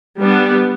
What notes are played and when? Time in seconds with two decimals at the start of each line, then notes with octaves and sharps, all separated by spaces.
0.18 G3 B3 D4